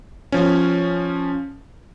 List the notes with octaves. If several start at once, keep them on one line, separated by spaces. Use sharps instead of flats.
F3 C#4